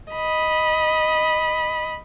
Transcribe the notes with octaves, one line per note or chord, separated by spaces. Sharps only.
D#5 B5